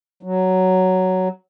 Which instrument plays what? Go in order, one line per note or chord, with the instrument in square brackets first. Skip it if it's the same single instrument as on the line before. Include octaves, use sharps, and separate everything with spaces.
[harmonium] F#3